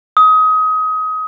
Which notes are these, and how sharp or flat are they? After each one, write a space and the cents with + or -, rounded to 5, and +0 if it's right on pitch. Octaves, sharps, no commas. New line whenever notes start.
D#6 +25